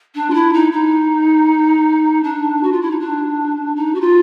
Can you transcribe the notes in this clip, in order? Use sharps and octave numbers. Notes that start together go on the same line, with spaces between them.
D4
F4
E4
D#4
D#4
D4
F#4
F4
E4
D#4
D4
D#4
F#4
F4